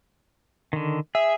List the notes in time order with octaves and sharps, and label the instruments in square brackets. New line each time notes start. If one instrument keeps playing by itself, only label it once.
[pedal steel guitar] D3 D#3
[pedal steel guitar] G#4 [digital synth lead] E5